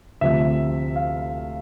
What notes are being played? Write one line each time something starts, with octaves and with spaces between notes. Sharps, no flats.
D2 C3 F3 E5
F5